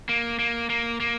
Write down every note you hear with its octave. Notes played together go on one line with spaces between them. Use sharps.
A#3
A#3
A#3
A#3